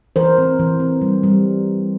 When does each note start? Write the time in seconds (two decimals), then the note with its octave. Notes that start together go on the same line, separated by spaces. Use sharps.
0.16 E3 A#4 C5
0.38 C4
0.59 E3
0.80 C4
1.02 G3
1.23 G3